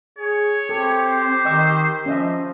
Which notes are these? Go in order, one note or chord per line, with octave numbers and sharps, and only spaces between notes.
G#4 C#5
C4 G4 A4
C5
D#3 D#5 C#6 E6
F3 C#4 D#5 E5